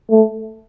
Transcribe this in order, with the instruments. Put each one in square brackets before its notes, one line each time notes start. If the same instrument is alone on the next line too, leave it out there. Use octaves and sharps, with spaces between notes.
[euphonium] A3